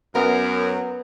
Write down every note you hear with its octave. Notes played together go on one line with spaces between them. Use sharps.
F#2 B3 A#4